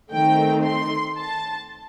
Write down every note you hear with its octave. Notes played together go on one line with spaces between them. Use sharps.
D#3 A3 C4 D#4 G5
C6
A5